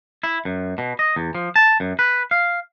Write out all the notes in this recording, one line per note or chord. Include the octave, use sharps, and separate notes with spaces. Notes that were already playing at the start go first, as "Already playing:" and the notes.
E4
F#2
B2
D#5
E2
F3
A5
F#2
B4
F5